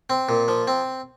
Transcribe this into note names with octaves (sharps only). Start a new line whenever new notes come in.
C4
A#2
F3
C4